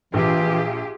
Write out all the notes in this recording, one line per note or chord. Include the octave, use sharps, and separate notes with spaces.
A#1 E3 F4 G4 G#4